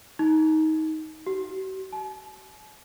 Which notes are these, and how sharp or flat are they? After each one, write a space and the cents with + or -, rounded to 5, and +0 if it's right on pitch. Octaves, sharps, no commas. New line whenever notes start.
D#4 +20
F#4 +45
A5 -45